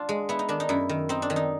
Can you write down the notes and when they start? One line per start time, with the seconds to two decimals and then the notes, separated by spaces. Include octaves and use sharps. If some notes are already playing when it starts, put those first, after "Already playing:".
Already playing: D4 F4
0.09 G#3
0.29 B3 E4
0.39 D#4
0.49 D#3 D4
0.60 D#4
0.69 F#2 E4
0.89 D#3
1.09 C4 D#4
1.22 D4
1.30 D#3
1.36 D#4